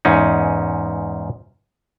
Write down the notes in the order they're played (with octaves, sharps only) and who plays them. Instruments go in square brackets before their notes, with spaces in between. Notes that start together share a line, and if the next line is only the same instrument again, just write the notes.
[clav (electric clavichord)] E2 G#2 C#4 D#4